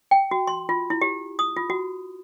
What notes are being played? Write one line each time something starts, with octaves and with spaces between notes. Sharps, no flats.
G5
F#4
C6
F4
E4
G4
D#6
F4
F#4